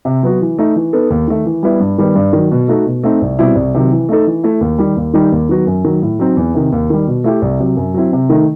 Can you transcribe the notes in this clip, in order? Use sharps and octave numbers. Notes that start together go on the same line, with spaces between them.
C3
F#3 B3 F#4
E3
A3 D#4
E3
B3 D#4 A4
D#2
D#3 A3
E3
G3 B3 E4
G2
D#3 G3 B3
G2
D#3 F#3
B2
A3 D#4 F#4 A4
B2
A3 C4 D#4
C2
B2 G3 C4 E4
C2
C3 D#3 F#3
E3
A3 D#4 A4
E3
A3 E4
D#2
D#3 G3
D#2
D#3 G3 D#4 G4
D#2
D#3 F#3 B3 F#4
F#2
D#3 F#3
A2
F#3 C4 D#4
E2
C3 D#3
D#2
D#3 G3
B2
A3 E4 G4
C2
C3 F#3
F#2
F#3 C4 E4
C3
D#3 A3 D#4